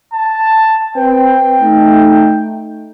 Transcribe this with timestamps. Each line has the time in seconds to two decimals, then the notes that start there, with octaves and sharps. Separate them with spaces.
0.12 A5
0.96 C4 B4 C5 G5
1.61 A3 D#4